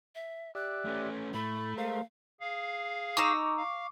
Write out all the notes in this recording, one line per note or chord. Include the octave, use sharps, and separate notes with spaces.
E5
G4 D5 E5 F#6
A3 C#4
A2 A3 B5
G#3 A#4 C5 F5
G#4 F5
D#4 A#5 C#6 D6 E6
F5